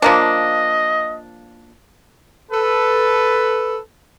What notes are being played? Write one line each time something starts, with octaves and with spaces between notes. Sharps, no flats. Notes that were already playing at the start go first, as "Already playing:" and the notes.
F3 A#3 D4 D#5
A4 B4